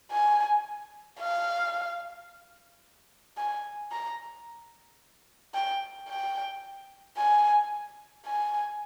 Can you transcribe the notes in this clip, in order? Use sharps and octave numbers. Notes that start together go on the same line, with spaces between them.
G#5
F5
G#5
A#5
G5
G5
G#5
G#5